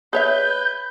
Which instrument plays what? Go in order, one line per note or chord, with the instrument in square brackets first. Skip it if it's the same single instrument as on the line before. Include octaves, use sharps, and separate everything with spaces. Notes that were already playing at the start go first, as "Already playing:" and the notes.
[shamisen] G#4 C#5 E5 [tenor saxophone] B4 [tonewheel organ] G6